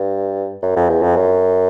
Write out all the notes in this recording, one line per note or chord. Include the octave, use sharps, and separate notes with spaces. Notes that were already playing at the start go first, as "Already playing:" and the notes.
Already playing: G2
F#2
F2
E2
F2
F#2